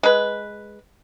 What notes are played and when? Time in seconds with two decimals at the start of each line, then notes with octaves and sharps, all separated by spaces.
0.03 G#3 B4